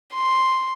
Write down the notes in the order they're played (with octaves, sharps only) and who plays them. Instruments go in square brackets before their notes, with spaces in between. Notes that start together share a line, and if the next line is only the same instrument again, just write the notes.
[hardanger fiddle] C6